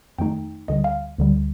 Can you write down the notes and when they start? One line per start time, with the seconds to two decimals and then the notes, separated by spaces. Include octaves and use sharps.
0.18 F2 D#3 A3 D#4 G5
0.68 D2 D3 G3 D#5
0.84 F5
1.18 D2 D3 G3